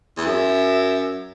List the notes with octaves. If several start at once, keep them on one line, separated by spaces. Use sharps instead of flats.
E2
F#2 E5